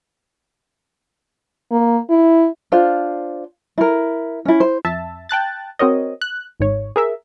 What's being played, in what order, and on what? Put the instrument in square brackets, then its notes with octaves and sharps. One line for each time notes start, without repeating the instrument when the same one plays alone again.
[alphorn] A#3
E4
[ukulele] D4 F4 C5 F5
E4 A#4
C#4 E4
C5
[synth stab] F2 E5 A5
G5 A5 F#6 A6
C4 F#4 A#4 C#5 D#5
F#6
G#1 G#2 C#5
G#4 A#4 E5